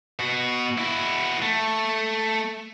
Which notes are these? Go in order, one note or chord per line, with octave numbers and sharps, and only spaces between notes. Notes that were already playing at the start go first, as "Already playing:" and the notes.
B2 F#4
E4 F#4
A3